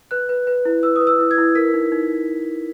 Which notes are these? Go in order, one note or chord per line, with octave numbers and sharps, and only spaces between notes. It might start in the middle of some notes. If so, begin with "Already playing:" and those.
B4 F#6
B4
B4
E4
B4 E6
D#6
B4
E6
E4
G#6
E4
A#4 B6
D#4
D#4